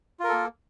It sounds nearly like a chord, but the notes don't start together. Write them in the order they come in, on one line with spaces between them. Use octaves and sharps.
F4 A#4 A4 A#3